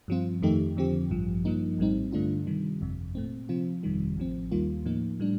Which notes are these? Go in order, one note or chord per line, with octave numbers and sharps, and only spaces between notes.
G2 F3 C4 F4
F2 D#3 A3 D#4 G4
F2 D3 F3 C4 G4
A1 G2 F3
G2 F3 A#3 D#4
A#1 A2 G3 C4 D#4
G2 D3 A3 D4 F4
C3 D#3 G3
G1 F2 C3
A#2 A3 C4
C3 F3 C4 F4
G1 F2 C3 D#3 G3
A1 A2 F3 C4
D#2 D#3 G3 A#3 F4
A2 F3 A#3 D#4
A2 G3 D4